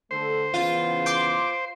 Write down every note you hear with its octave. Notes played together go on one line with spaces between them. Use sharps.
D3 A3 A4 C5
C#3 E3 B3 F4
G5 C6 D6